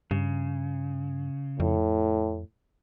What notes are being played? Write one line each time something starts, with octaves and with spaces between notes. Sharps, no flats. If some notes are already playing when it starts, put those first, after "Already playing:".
G2 C#3
F2 A2